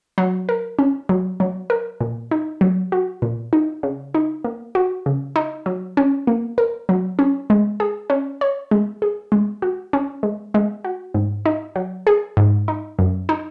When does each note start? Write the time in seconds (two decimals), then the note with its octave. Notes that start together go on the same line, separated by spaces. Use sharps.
0.18 F#3
0.49 A#4
0.79 C#4
1.09 F#3
1.40 F#3
1.70 A#4
2.00 A#2
2.31 D#4
2.61 F#3
2.92 F#4
3.22 A#2
3.53 D#4
3.83 C#3
4.15 D#4
4.44 A#3
4.75 F#4
5.06 C#3
5.36 D#4
5.66 F#3
5.97 C#4
6.27 A#3
6.58 A#4
6.89 F#3
7.19 C#4
7.50 G#3
7.80 G#4
8.10 C#4
8.41 C#5
8.71 G#3
9.02 G#4
9.32 G#3
9.62 F#4
9.93 C#4
10.23 G#3
10.54 G#3
10.85 F#4
11.14 G#2
11.46 D#4
11.76 F#3
12.07 G#4
12.37 G#2
12.68 D#4
12.99 F#2
13.29 D#4